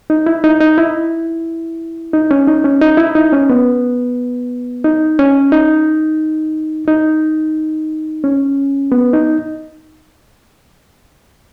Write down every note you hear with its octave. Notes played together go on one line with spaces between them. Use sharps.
D#4
E4
D#4
D#4
E4
D#4
C#4
D#4
C#4
D#4
E4
D#4
C#4
B3
D#4
C#4
D#4
D#4
C#4
B3
D#4